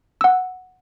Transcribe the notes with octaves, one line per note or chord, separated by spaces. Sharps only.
F#5 E6